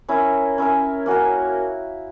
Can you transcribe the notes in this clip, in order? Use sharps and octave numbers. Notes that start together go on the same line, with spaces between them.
C#4 E4 A#4
C#4 E4 A#4
A#3 C#4 F#4 A#4